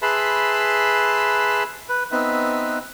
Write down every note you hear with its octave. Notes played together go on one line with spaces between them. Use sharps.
G#4 B4 E5 A5 B5 C6
B4
B3 C4 D#4 B4 E5